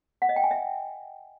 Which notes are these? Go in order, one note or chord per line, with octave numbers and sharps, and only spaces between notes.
F#5
D#5
G5
G#5
E5